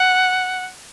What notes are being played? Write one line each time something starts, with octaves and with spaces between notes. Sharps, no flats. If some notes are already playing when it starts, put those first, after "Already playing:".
Already playing: F#5